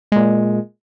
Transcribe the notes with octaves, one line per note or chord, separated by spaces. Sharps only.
A#2 G#3